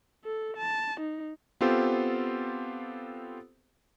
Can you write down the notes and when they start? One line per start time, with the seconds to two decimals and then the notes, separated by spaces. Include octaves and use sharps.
0.25 A4
0.57 A5
1.00 D#4
1.61 B3 C4 F4 G4 A4 C5